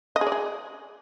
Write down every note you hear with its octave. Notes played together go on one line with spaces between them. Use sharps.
D#5
G#4
D5
G#4